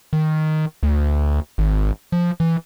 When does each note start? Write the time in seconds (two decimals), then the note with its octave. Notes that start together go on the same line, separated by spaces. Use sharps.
0.13 D#3
0.83 D2
1.58 G#1
2.12 F3
2.40 E3